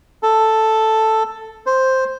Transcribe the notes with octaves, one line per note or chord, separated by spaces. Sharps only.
A4
C5